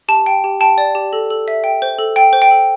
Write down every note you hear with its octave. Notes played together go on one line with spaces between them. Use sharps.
G4 A5
G5
G4
G5 A5
D5
G4
A4
A4
E5
G5
C5
A4
G5
C5
G5
A4